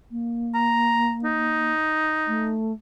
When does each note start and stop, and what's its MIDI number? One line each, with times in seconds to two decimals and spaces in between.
0.11 1.72 58
0.54 1.15 82
1.24 2.56 63
2.27 2.72 57